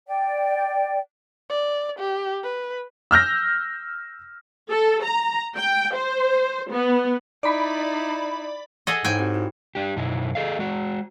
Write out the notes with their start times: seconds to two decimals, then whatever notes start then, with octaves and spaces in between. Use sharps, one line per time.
0.07 D5 G5
1.50 D5
1.99 G4
2.44 B4
3.11 E6 F6 G6 A#6
4.70 A4
5.04 A#5
5.57 G5
5.95 C5
6.70 B3
7.43 D#4 E4 D5 B5
8.87 G#4 A4 D#5 F#5 G#5
9.05 G#2 E4 A4 C#5 G5 G#5
9.19 C4 F#4 G4
9.34 E4 F#4
9.75 D4 G4
9.96 F#2 B2 D#4 E4
10.35 G#4 A4 D#5 F5
10.59 G#3 F#4